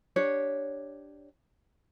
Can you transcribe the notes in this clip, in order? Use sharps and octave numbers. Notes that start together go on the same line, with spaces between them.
D4 G4 C#5